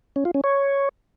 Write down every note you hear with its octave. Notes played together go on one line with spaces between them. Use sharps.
C#4
F4
C#4
C#5